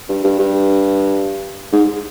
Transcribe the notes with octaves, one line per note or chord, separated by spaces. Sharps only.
G2
G2
G2
G#2